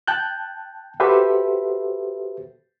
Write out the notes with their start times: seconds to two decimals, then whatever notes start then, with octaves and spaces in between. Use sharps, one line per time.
0.08 G5 A5 F#6 G6
1.00 F#4 G4 A4 B4 C5 E5